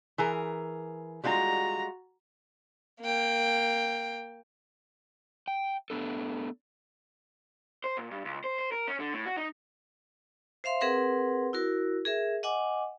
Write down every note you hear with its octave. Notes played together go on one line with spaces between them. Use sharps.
E3 G#4 A#4
G3 G#3 F4 F#4 A#5
A#3 G5
G5
A3 B3 D4 A4
C5
A#2
G2
C#2
C5
C5
A#4
C#4
D3
A2
F#4
D#4
C5 E5 F5 C6
C4 G#4 A#4 B4 F#5 C6
E4 F#4 A#4
G#4 A#4 E5
D#5 F#5 G#5 D6